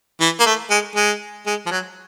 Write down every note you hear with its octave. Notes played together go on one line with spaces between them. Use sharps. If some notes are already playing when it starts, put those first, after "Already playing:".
E3
A#3
A3
G#3
G#3
G#3
F3
F#3